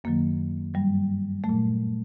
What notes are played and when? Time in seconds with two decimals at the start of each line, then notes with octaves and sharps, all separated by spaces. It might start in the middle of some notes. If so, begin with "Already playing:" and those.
0.04 F#2 D#3 F#3 A#3
0.74 G2 F#3 G3
1.44 F#3 A3
1.49 A#2